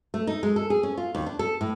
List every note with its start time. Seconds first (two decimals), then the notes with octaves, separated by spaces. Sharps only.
0.14 A3
0.27 D#4
0.43 G#3
0.56 A4
0.70 G#4
0.83 C#4
0.97 F4
1.15 D#2
1.26 D4
1.39 A4
1.61 A2